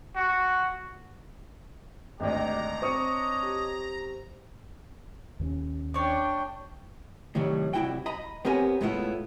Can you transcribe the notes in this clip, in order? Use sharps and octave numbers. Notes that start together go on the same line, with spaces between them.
F#4
G#1 D2 G4 D5 D#5 A#5
C4 D4 C#5 D#5 C#6 D#6 C#7
G4
D#2 C4 C#4
D4 C#5 D5 G5
C2 A2 D#3 F#3 G3
C2 G2 E4 F#4 G5
D#5 A#5 B5
B3 C4 G4 A#4 C#5 G#5
A2 G#3 A3 B3 E4 F4